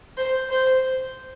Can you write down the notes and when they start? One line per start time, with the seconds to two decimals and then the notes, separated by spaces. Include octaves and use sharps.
0.17 C5
0.50 C5